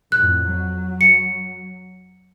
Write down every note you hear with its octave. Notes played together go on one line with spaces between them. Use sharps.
F2 A2 F#6
F#3
C#7